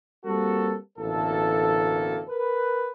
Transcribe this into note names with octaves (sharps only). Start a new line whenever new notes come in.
G3 A#3 C4 F#4 A4
A1 D2 B2 A#3 A4
A#4 B4